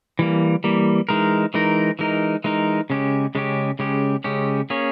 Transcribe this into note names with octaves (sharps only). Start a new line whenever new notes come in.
E3 G3 A#3
E3 G3 A#3
E3 G#3 D#4 A#4
E3 G#3 D#4 A#4
E3 G#3 D#4 A#4
E3 G#3 D#4 A#4
C#3 G#3 C#4 G4
C#3 G#3 C#4 G4
C#3 G#3 C#4 G4
C#3 G#3 C#4 G4
A#3 C#4 G#4 C#5